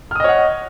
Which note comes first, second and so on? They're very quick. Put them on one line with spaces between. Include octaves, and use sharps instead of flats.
F6 D#6 D#5 C#5 F#5